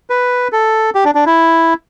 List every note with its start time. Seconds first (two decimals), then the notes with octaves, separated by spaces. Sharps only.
0.10 B4
0.52 A4
0.95 G4
1.05 D4
1.15 D4
1.26 E4